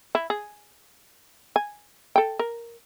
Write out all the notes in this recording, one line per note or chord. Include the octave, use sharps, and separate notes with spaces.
E4
G#4
G#5
A4 G5
A#4